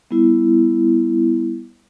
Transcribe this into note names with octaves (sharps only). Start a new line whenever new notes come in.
G3 B3 E4